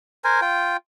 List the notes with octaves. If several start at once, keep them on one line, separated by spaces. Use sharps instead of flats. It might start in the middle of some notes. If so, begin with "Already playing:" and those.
A#4 C5 G#5
F4 G5